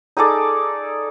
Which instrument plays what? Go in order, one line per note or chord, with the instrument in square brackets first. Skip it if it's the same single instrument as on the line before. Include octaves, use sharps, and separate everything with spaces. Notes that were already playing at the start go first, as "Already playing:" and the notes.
[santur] D#4 G#4 A4 D5